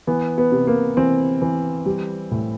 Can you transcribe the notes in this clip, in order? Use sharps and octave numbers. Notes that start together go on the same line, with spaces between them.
E3 B3
B3
C3
A#3
E3 C4
E3
G3
A2